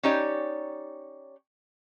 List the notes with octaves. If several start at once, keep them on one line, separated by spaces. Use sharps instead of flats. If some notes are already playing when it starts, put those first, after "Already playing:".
C#4 D#4 G4 C#5 D5